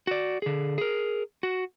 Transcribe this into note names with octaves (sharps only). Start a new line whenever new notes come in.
F#4 D5
D3 G#4
G#4 A#4
F#4